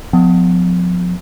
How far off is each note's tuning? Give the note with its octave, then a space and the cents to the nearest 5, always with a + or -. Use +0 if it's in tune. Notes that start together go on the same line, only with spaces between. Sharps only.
F3 +40 B3 +40